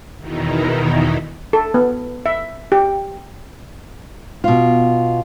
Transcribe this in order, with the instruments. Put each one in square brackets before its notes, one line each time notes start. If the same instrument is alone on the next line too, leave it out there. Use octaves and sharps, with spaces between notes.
[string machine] E2 B2 D#3 E3 D#4
[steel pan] A4
B3
E5
G4
[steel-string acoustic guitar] B2 F4